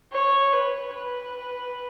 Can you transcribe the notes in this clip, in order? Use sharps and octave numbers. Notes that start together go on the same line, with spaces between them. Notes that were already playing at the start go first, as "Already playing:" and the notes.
C#5
B4
B4